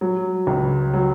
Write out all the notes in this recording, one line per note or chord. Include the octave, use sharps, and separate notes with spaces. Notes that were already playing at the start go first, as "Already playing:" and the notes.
F#3
C#2
F#3